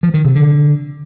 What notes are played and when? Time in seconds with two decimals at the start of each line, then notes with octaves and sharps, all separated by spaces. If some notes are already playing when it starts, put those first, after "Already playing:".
0.03 F3
0.14 D#3
0.25 C3
0.35 D3